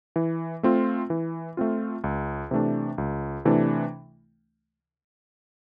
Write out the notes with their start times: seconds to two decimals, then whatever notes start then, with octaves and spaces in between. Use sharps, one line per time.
0.16 E3
0.63 A3 C4 F4
1.10 E3
1.57 A3 C4 F4
2.04 C#2
2.51 C3 E3 A3 D4
2.98 C#2
3.45 C3 E3 A3 D4